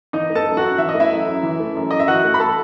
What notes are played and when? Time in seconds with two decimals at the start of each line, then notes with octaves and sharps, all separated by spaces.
0.13 E3 D#4 D#5
0.30 A3
0.35 A4 A5
0.46 F#2
0.57 F#4 F#5
0.62 F#2
0.78 E3 E5
0.89 D#5
0.94 A3
1.00 E4 E5
1.11 F#2
1.27 F#2
1.43 E3
1.60 A3
1.75 F#2
1.91 F#2 D#5
1.99 E5
2.08 E3 F#4 F#5
2.24 A3
2.34 B5
2.40 A4 A5